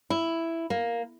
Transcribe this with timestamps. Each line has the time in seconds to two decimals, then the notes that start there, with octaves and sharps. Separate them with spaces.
0.10 E4
0.70 A#3